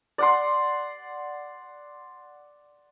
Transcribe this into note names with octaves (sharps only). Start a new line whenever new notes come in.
D5 F#5 C6